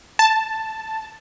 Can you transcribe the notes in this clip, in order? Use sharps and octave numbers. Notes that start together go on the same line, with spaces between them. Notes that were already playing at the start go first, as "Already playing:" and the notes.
A5